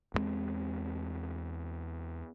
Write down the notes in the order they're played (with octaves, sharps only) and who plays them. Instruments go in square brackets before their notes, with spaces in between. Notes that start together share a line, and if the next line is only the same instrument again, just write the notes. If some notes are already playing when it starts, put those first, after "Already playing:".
[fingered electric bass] E2 G2 G#3 C4